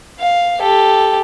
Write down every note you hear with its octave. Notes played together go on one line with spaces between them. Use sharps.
F5
G4 A4